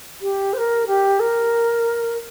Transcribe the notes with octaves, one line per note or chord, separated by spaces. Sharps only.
G4
C5
A#4
G4
A#4